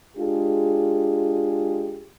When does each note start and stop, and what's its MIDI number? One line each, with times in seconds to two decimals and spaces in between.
0.17 2.07 56
0.17 2.07 62
0.17 2.07 65
0.17 2.07 67
0.17 2.07 68